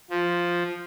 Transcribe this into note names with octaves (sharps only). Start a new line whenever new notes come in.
F3